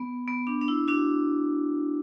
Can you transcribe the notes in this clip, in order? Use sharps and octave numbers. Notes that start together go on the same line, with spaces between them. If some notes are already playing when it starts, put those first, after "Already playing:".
Already playing: B3
B3
D4
D4
E4
D4 F#4